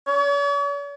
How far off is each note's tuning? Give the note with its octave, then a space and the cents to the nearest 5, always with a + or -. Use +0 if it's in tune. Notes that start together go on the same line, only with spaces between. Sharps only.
C#5 +45